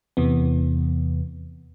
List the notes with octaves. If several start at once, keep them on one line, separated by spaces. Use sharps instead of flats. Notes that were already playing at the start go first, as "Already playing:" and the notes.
E2 C3 E3 B3